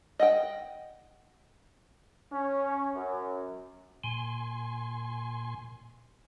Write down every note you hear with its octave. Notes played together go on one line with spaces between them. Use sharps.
D#5 F#5 G5
C#4
F#2
A#2 G#5 C6